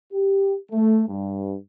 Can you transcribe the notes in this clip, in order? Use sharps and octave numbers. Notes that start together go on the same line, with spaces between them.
G4
A3
G2